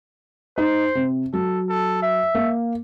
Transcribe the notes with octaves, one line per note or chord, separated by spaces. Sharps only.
D#4 C5
C3
F#3 A4
A4
E5
A#3